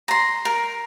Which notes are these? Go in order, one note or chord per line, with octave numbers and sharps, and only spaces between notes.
A#5 C6
A#4